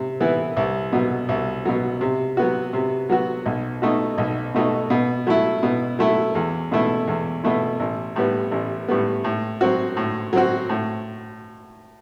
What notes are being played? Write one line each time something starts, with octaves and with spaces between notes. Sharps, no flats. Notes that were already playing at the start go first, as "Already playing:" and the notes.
Already playing: C3
E3 B3 E4
C2
B2 F#3
C2
B2 F#3
C3
F#3 B3 F#4
C3
F#3 B3 F#4
B1
B2 A3 D#4 F#4
B1
B2 A3 D#4 F#4
B2
F#3 A3 E4
B2
F#3 A3 E4
E2
B2 A3 E4
E2
B2 A3 E4
A1
A2 G3 B3
A1
A2 G3 B3
A2
F#3 C4 F#4
A2
F#3 C4 F#4
A2